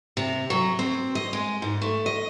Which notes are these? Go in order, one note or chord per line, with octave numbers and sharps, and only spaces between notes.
C3
F#3
C4
D#5
G#3
G#2
A3
D#5